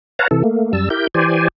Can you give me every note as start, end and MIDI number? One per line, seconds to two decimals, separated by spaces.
0.19 0.28 71
0.19 0.28 73
0.19 0.28 77
0.19 0.28 78
0.19 0.28 81
0.19 0.28 82
0.31 0.43 48
0.31 0.43 52
0.31 0.43 69
0.44 0.72 57
0.44 0.72 58
0.73 0.89 42
0.73 0.89 55
0.73 0.89 81
0.73 0.89 88
0.90 1.07 64
0.90 1.07 67
0.90 1.07 70
0.90 1.07 91
1.15 1.48 52
1.15 1.48 67
1.15 1.48 72
1.15 1.48 74
1.15 1.48 80